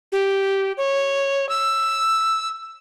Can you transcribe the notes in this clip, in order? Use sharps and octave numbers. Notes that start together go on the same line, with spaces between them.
G4
C#5
E6